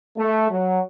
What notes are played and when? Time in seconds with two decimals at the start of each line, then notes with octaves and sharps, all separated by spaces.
0.18 A3
0.51 F#3